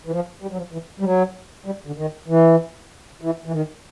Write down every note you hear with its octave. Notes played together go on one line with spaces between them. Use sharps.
E3
F3
G3
F#3
F3
E3
G3
F#3
G3
D3
D#3
E3
E3
E3
D#3